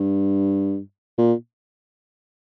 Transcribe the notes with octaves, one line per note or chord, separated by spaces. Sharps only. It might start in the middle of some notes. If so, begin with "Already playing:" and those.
Already playing: G2
A#2